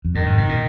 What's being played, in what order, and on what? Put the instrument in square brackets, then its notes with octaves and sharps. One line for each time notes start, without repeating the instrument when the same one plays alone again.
[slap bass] F2
[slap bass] G2 [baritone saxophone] D#3
[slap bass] G#2
C3
A#2